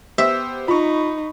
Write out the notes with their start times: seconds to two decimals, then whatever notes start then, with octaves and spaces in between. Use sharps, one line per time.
0.18 B3 G4 C5 E5
0.68 D#4 F4 B5 C#6